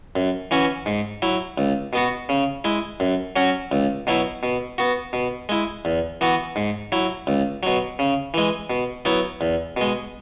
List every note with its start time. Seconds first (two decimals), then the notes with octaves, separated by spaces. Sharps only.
0.16 F#2
0.51 E3 C#4 F#4
0.86 G#2
1.22 F#3 E4
1.58 C#2
1.93 B2 B3 F#4
2.29 C#3
2.64 G#3 E4
3.00 F#2
3.36 F#3 C#4 F#4
3.72 C#2
4.07 B2 F#3 E4
4.43 B2
4.78 B3 F#4
5.13 B2
5.49 G#3 E4
5.85 E2
6.21 E3 B3 F#4
6.56 G#2
6.92 F#3 E4
7.27 C#2
7.63 B2 F#3
7.99 C#3
8.34 E3 G#3
8.70 B2
9.05 F#3 B3 E4
9.41 E2
9.77 B2 G#3